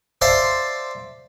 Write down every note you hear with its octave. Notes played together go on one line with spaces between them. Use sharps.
C5 D5 E5 F5 A5 C6